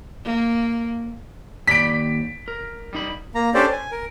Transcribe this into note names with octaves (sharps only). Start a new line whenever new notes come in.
A#3
D#2 D5 B5 B6 D7
A#4
G3 D#4 B5
A#3 A#5
C#4 D4 G4 A4 C5 D5
G#5
A#4